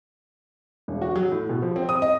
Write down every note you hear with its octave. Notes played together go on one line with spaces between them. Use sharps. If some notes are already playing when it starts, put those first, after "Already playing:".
E1
F#4
F#3
A2
B2
F3
C4
D#6
D#5